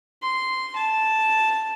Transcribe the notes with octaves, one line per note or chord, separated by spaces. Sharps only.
C6
A5